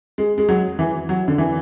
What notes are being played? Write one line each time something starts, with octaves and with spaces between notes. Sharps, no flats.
G#3
G#3
F#3
E3
F#3
D3
E3